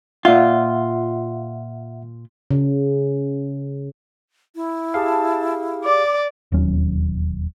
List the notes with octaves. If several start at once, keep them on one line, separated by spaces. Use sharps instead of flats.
A#2 F4 E5 F#5
C#3
E4
G4 G#4 F5 A5
D5 D6
E1 D#2 F#3 C#4